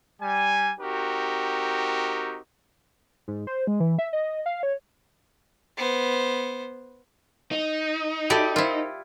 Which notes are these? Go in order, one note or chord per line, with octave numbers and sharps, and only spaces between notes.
G3 G#5
C4 D#4 F#4 G4 A#4
G#2
C5
G#3
E3
E5
D#5
F5
C#5
B3 C5
D#4
E4 F#4 G4 A4 D5 A5
E4 F4 A#4 C5